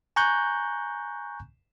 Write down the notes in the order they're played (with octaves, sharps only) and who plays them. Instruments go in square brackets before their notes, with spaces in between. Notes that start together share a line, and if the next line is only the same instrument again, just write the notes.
[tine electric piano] G#5 A#5 C#6 F#6 G6